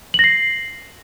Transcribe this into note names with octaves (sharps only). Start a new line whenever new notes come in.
A#6 C7 F#7